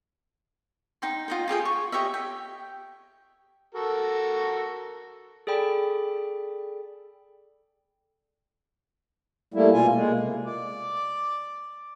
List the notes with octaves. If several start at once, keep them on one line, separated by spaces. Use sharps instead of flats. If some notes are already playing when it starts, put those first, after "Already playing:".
D#4 G5 C6
F4 D#5 G5
F4 G4 G#4 G5
C#6
G4 C#5 D#5 E5
G5
F#4 A4 A#4
G#4 A4 D5 G5 B5
G3 A3 A#3 E4
B2 F4 G#5
G#3 A#3
C3
D5